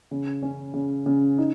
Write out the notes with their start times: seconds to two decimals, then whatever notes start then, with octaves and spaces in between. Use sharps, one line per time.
0.11 C#3
0.43 C#4
0.74 C#3
1.06 C#3
1.38 D#4